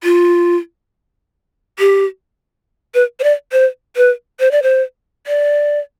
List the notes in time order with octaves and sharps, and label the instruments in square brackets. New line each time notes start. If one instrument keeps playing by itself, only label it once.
[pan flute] F4
G4
B4
C5
D5
C5
B4
C5
D5
C5
D5